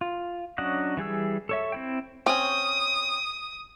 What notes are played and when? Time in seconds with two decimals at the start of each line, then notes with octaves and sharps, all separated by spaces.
0.01 F4
0.58 F#3 C#4 D4 D#5 F#5
0.97 E3 G3 G#4 E6
1.49 A4 C#5 E5
1.72 C4 E4 G5
2.26 C4 C#4 D#6